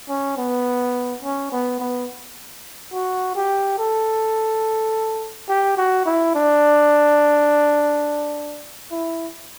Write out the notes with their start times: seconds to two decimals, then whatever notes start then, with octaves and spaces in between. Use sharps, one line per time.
0.09 C#4
0.37 B3
1.22 C#4
1.52 B3
1.80 B3
2.93 F#4
3.35 G4
3.78 A4
5.48 G4
5.77 F#4
6.05 E4
6.35 D4
8.91 E4